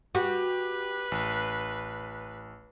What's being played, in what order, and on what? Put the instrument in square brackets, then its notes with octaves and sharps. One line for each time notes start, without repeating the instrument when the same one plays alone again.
[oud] F#4 [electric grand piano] G4 [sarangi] B4
[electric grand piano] A1